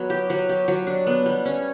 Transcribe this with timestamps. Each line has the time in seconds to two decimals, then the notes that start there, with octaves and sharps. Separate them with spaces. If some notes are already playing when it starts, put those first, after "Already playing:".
Already playing: F#3 B3
0.10 G4
0.30 F#3
0.49 G4
0.68 F#3
0.87 D4
1.07 B3
1.26 G3
1.45 C#4